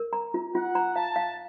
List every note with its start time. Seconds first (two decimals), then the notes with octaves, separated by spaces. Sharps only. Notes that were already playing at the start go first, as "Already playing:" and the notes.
Already playing: A#4
0.13 A#5
0.34 F4
0.55 F4 F#5
0.75 A#5
0.96 F5 A5
1.16 F5